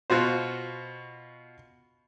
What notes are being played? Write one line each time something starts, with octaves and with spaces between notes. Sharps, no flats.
B2 F4 F#4 C5